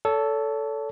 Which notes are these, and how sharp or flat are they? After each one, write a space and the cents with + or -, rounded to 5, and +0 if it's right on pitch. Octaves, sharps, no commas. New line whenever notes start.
A4 +0 C#5 +40